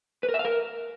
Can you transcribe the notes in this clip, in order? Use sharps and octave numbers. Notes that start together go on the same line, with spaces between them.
B4
A#4
E5
F5
A#4